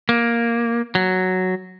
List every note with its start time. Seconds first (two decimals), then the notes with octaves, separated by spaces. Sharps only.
0.09 A#3
0.95 F#3